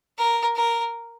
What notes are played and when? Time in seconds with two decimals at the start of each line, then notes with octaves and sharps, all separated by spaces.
0.18 A#4
0.56 A#4